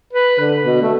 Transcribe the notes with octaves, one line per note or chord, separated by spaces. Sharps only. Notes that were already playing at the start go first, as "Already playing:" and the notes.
B4
D3
B2
A3